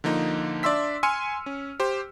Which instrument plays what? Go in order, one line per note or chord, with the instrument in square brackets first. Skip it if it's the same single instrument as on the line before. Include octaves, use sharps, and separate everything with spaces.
[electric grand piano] D3 F3 A#3 D#4
D4 D5 E5 C6 E6 B6
G#5 C6 E6 F6 C#7 D#7
C#4
G4 C5